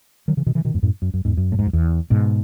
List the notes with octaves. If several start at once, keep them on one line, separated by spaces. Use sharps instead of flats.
D#3 F#3
C#3 E3
B2 D#3
C#3 E3
B2 D#3
E2 G#2
F#2 A2
F#2
F#2
E2 G#2
F#2
A2
G#2
F#2
E2
G#2 B2